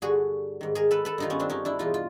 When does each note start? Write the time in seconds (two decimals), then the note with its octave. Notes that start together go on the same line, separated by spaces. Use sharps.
0.02 G2 D3 F#4 G#4
0.61 G#2 D#3
0.75 G#4 A#4
0.91 A4 B4
1.05 A4 B4
1.18 G2 D#3 D#4 F4
1.30 B3 C#4
1.40 C4 D4
1.50 C#4 D#4
1.65 D4 E4
1.79 E2 B2 D#4 F4
1.94 F4